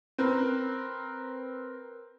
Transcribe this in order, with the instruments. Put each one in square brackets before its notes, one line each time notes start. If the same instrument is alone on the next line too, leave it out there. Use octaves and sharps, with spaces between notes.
[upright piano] C4 A#4 B4